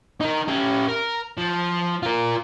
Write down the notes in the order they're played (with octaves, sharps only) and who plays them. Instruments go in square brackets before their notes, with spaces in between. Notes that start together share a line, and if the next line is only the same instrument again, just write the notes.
[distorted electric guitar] D#4 A#4
C#4 G4
A#4
F3
F4 A#4